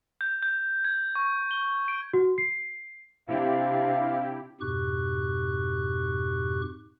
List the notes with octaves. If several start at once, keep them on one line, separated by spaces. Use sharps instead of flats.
G6
G6
G#6
C#6
G7
D7
F#4
C7
C3 C4 D4 E4 G4 E5 F5
F2 G#2 B2 G4 C#6 F#6